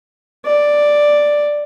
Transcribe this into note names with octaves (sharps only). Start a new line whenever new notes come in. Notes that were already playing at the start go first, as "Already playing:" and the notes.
D5